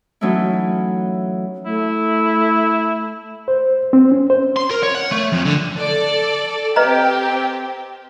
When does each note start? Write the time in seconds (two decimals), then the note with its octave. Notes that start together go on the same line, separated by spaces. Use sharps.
0.21 E3 F#3 A3 C#4 D#4 E4
1.66 A3 E4
3.48 C5
3.93 C4
4.12 C#4
4.30 C5
4.56 C6
4.70 A#4
4.83 C#5
4.95 F#5
5.12 A3
5.32 F2
5.45 D3
5.77 A4 D5
6.76 C4 G4 B4 D#5 A#5